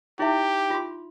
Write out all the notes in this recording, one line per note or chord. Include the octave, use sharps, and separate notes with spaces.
D#4 E4 G4 E5
F4 C6